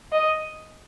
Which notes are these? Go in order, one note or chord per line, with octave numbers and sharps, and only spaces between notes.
D#5